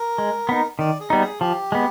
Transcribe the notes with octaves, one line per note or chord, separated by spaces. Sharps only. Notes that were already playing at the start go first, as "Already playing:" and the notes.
Already playing: A#4
G#3
B3 D#4
D#3 D5
G#4
G3 B3 D#4
G#4
F3 G4
G#3 B3